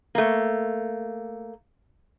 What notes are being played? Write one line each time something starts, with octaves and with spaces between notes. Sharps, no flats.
A3 A#3